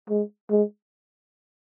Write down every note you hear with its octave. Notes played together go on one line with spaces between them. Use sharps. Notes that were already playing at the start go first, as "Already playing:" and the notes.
G#3
G#3